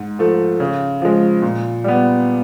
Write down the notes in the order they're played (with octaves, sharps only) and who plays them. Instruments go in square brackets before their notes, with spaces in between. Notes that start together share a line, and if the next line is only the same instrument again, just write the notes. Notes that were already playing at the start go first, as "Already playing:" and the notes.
Already playing: [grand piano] G#2
F3 A3
C#3
F3 G#3
A#2
G3 B3